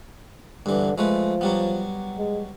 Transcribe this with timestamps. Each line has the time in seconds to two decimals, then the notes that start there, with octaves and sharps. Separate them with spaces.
0.66 G2 D3 E3
0.98 F3 G#3 A3 B4
1.41 F#3 G3 B3
2.18 G#3